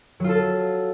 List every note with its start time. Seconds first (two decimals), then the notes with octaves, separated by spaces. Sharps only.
0.20 F#3
0.24 F4
0.29 A4